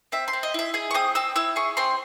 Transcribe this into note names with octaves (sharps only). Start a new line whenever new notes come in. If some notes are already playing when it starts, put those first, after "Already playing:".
C4 E5
C6
C4
D#5
E4 E5
G#4 G#5
C#6
C4 D#6
C4 E6
E4 E6
G#4 C#6
C4 C6